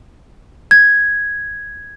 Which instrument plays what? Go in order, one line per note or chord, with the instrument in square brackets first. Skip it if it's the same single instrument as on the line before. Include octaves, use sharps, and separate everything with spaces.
[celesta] G#6